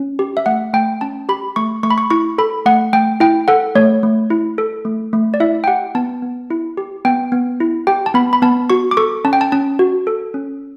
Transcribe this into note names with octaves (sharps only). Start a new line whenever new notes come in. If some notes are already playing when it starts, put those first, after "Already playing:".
Already playing: C#4
G4
E5
A3 F#5
A3 G5
C#4 A5
G4 B5
A3 C#6
A3 C#6
B5
C#6
E4 C#6
A4 B5
A3 F#5
A3 G5
E4 G5
A4 F#5
A3 C#5
A3
E4
A4
A3
A3
D5
E4 E5
G5
G4 F#5
B3 A5
B3
E4
G4
B3 G5
B3
E4
G4 G5
A5
B3 B5
B5
B3 A5
F#4 C#6
D6
A4 C#6
C#4 A5
G5
A5
C#4 A5
F#4
A4
C#4